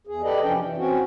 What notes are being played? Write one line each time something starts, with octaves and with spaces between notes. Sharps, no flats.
E2 G#4
G4 A4 B4 D5 D#5
F#2 C3 F3 C#4 D4 G5
E3
C4 C#4 F#4